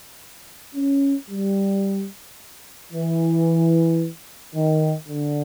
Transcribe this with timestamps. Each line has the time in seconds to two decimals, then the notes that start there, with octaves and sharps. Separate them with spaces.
0.76 C#4
1.30 G3
2.93 E3
4.55 D#3
5.09 D3